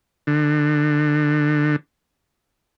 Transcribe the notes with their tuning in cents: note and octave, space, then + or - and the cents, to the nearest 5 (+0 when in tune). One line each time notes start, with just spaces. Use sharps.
D3 +25